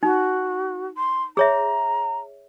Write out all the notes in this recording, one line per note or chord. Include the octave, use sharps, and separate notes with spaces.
D#4 F#4
C6
G#4 C#5 E5 A#5